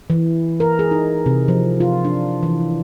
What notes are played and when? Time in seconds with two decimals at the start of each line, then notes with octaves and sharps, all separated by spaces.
0.10 E3
0.60 A#4
0.79 G#4
0.91 D#4
1.26 C3
1.48 F3
1.80 F4
2.05 D4
2.43 E3